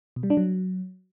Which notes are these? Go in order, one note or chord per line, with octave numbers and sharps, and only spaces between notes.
B2
G3
D4
F#3